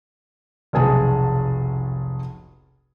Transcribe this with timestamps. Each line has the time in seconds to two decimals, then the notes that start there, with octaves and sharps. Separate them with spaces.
0.73 F1 B1 G#4 A5 D#6